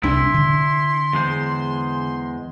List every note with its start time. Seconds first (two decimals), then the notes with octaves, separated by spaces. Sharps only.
0.03 C2 C3 D4 E4 C6
0.34 D3
1.13 E2 G#3 C5